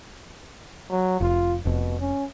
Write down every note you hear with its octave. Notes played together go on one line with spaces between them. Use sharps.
F#3
F1 F4
F1 B2
C#4